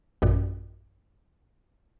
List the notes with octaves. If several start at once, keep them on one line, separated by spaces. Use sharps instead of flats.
A1 F#2 A#2